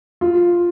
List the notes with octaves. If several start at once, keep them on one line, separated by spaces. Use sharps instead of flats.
F4